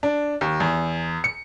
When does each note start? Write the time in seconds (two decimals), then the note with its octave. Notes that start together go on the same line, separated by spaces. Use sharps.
0.03 D4
0.41 D#2
0.60 E2
1.24 C#7